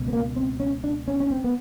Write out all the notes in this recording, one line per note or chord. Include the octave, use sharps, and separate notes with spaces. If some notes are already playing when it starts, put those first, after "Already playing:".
Already playing: C#2 B2
B3
A#3
C4
C#4
D4
C#4
C#4
C4
B3